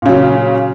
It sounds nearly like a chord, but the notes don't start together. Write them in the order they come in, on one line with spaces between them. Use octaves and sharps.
A#2 C#3 F#3